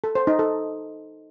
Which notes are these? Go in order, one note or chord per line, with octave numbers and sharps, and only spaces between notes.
A4
C5
D#4
A4